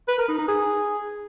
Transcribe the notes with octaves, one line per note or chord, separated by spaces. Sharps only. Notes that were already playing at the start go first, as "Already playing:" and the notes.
B4
A#4
D#4
D#4
G#4